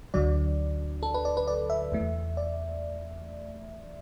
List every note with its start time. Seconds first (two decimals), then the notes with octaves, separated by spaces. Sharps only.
0.14 D2 D3 F#3 D5
1.03 A4
1.14 B4
1.25 D5
1.37 B4
1.48 D5
1.70 E5
1.92 E2 E3 A3
2.37 D5